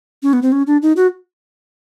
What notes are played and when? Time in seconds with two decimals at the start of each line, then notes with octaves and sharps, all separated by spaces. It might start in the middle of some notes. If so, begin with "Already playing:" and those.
0.23 C#4
0.33 B3
0.42 C4
0.52 C#4
0.67 D4
0.82 D#4
0.97 F#4